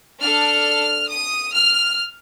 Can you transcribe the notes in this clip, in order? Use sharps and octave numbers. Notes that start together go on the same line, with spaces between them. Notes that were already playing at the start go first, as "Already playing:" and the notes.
D4 A4 F6
D#6
F6